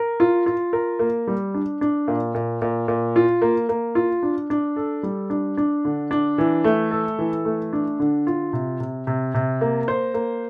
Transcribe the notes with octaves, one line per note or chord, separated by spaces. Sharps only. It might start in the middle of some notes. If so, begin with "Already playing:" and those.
Already playing: A#4
F4
F4
A#4
A#3
G3
D4
D4
A#2
A#2
A#2
A#2
F4
A#3
A#3
F4
D4
D4
A4
G3
D4
D4
D3
D4
E3
A3
A4
E3
A3
D4
D3
F4
C3
C3
C3
C3
A#3
C5
A#3